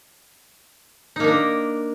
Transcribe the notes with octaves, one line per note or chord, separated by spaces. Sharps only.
A#3 D4 D#4 A#4